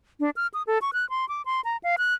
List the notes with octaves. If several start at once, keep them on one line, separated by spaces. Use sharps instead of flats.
D4
F6
D#6
A4
C#6
F#6
C6
D6
C6
A#5
F5
F#6